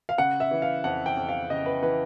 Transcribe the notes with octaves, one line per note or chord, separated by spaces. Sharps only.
F5
C#3 F#5
E5
E3
F5
F2 F#5
G5
F2
F5
C#3 D#5
B4
E3 B4